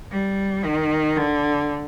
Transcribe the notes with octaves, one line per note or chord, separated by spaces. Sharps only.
G3
D#3
D3